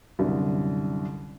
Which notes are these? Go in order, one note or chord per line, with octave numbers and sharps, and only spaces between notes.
C2 F#2 D3